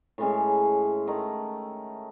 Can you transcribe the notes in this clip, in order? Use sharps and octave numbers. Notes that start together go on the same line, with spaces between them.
A2 E3 G#3 C#4
D#3 A3 D#4